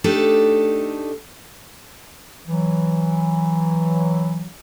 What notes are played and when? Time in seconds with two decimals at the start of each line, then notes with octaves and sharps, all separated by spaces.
0.04 A3 D4 D#4 G4 A4
2.47 E3 F#3